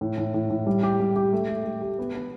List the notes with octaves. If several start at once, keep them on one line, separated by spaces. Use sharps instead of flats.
A2
A2
A2
A2
G3
G4
G3
G4
A3
A3
A3
G4
B3
B3